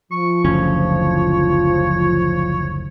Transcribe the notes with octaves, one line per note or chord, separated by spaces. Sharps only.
F3 C#6
F#1 D2 C#4 C#5